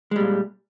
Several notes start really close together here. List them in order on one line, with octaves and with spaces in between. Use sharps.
G#3 G3 A#2